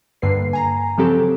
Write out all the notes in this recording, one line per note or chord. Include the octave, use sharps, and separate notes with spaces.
G2 D3 A#3 B4 C7
G#5 A#5
C#3 F3 F#3 C4 G4 A4